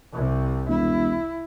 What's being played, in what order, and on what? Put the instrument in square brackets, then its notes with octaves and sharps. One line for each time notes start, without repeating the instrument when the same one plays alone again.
[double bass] C2 C3
[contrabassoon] E1 [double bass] E4